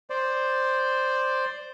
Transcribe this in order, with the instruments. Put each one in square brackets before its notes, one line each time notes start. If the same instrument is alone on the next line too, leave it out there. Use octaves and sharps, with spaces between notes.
[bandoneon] C5 D5